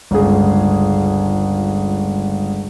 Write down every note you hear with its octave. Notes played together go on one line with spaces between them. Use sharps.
G1 C#2 G#4